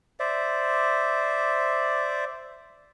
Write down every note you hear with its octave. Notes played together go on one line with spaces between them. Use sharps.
C5 D5 E5